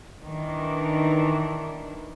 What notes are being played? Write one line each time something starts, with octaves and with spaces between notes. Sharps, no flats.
D#3 E3 D4